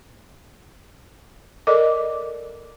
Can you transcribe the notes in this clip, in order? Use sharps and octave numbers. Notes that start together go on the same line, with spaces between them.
A4 A#4 D5 D#5 D6